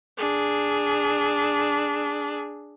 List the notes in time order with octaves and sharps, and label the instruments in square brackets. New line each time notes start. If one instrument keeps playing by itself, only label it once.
[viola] D4 G#4